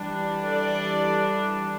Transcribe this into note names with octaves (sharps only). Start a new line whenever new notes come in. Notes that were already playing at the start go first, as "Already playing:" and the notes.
Already playing: E3 G3 D4
A4 D5